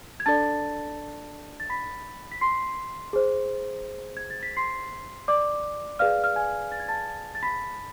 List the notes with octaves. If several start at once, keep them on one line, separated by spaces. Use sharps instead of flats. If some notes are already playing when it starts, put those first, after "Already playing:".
G#6
D4 A4 D5 A5 A6
A6
B5 B6
B6
C6 C7
G#4 C5
G#6
A6
B6
C6 C7
D5 D6
G#4 B4 D5 F5 F6
F6
G#5 G#6
A6
G#6
A5 A6
A6
B5 B6